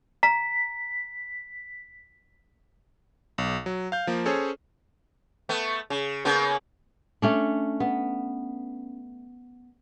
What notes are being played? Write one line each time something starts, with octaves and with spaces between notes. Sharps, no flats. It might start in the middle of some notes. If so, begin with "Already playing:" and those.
A#5 B6
B1
F#3
F5 G6
F3 A#3
C#4 G#4 A4 C5 C#5
A3 B3
C#3
C#3 A#3 B3
A3 C#4 D4
B3